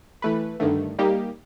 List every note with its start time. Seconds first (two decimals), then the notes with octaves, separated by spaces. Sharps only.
0.22 E3 A3 B4
0.60 G2 D3 D#3 A3
0.99 G3 A#3 D#4 G4